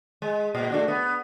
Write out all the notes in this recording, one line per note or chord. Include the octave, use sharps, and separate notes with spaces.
G#3
A#2
A3 D4 F#4
B3